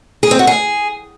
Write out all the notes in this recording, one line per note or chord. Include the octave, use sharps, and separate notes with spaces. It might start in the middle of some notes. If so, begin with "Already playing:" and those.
G#4
C4
F#4
G#4